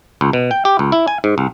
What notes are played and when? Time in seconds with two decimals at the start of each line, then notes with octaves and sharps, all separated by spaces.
0.21 C#2
0.33 B2
0.51 G5
0.65 G4
0.79 C#2
0.92 E4
1.08 G#5
1.24 G#2
1.38 C2